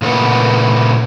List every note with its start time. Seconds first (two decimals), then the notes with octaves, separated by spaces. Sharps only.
0.02 A#2 C#3 A3 A#3 B4 F#5